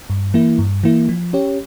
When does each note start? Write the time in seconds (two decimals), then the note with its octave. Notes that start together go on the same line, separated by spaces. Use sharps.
0.10 G2
0.34 E3 A#3 E4
0.59 G2
0.84 E3 A#3 E4
1.09 F3
1.33 C#4 G4 C#5